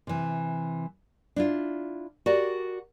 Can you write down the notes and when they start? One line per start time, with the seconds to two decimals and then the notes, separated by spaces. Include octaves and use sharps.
0.07 C3 E3
1.36 D4 E4 F4
2.26 F#4 G4 A#4 D5 F#5